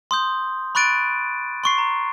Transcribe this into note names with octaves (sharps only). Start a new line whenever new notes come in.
C6 D#6 G6
B5 C#6 F#6 A6 D7 D#7
C6 C#6 C7
A#5